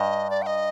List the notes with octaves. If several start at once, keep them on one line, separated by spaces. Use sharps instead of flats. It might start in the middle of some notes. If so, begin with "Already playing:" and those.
Already playing: G2 D#5
D5
G5
D#5